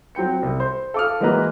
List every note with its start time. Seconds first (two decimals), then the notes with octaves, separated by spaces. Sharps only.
0.15 F#3 C4 G5 C#7
0.42 C2
0.60 C5
0.94 A4 F5 D6 D#6 F6
1.20 E3 G#3 A#3 F#4 B4 A#5